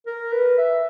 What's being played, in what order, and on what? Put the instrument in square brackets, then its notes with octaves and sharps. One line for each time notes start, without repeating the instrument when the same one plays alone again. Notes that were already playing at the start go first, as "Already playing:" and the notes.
[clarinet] A#4
B4
E5